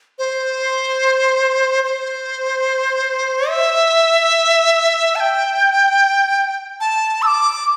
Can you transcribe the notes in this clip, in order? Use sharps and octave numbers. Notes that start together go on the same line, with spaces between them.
C5
C5
E5
A5
G5
A5
E6
D6